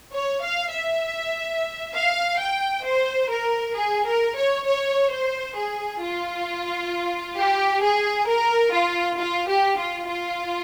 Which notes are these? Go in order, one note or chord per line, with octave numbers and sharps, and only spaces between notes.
C#5
F5
E5
F5
G5
C5
A#4
G#4
A#4
C#5
C#5
C5
G#4
F4
G4
G#4
A#4
F4
F4
G4
F4
F4